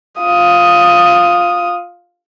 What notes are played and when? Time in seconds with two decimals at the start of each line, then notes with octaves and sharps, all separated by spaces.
0.19 F4 D#6